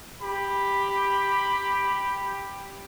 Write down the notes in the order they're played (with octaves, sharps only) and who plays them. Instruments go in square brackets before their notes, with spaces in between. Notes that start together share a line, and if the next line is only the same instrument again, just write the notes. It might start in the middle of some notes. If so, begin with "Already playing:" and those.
[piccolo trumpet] G4 [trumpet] B5